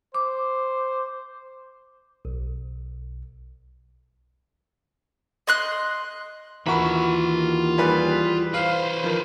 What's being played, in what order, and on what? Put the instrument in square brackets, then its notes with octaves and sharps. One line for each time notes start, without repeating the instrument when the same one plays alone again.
[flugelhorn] C5 [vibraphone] D6
[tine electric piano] B1
[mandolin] D#5 C6 F#6
[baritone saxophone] D#2 [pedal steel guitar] E3 F#4 [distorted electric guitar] F4 B5 [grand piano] A#4 C#6
[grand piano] G3 G#4 B4
[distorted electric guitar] B4 C5 [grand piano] F5
[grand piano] D#3 [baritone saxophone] F3